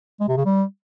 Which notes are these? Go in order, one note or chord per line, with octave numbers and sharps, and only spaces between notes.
G#3
C3
C#3
G3